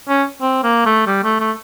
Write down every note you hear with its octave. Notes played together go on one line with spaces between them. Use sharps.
C#4
C4
A#3
A3
G3
A3
A3